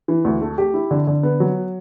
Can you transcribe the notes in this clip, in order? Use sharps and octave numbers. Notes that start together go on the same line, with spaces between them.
E3
D2
A3
G4
E4
D3
D3
B3
F#3